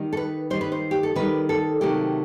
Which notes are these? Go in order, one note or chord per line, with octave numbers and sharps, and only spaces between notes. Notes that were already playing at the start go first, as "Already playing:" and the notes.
Already playing: D#3 G3
A4
B4
D#3 G3 C5
B4
C5
G4
A4
D#3 G3 B4
A4
C3 D#3 F#3 A3 G4